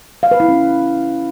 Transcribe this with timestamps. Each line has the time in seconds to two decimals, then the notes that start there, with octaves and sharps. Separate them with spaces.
0.23 F5
0.31 B4
0.40 E4
0.48 C#4